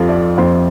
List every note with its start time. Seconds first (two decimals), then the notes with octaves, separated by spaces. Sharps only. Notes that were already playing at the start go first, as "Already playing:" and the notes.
Already playing: F2 F3 G4 A4
0.09 D5
0.38 F2 C5